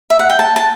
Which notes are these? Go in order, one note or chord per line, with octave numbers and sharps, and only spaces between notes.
E5
F#5
G5
A5
A5